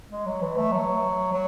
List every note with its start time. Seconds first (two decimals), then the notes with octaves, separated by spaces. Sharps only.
0.11 G#3
0.26 F#3
0.41 E3
0.57 A3
0.72 F#3
1.33 F#3